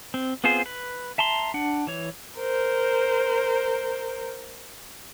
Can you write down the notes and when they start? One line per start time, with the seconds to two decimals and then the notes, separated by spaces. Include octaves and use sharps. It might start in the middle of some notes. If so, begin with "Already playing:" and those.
0.14 C4
0.44 B3 C4 F4 G#4 C5
0.66 B4
1.18 E5 A5 A#5 C6
1.54 D4 F#5
1.87 E3 C#5
2.38 A#4 C5